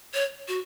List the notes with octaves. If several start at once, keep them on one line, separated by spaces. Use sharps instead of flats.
C#5
F#4